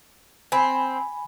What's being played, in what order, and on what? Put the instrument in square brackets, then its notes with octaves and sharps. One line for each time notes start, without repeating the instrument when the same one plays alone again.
[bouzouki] C4 [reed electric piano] G#5 B5